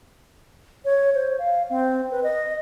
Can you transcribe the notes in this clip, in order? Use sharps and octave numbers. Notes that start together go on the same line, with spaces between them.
C#5
C5
F5
C4
B4
D#5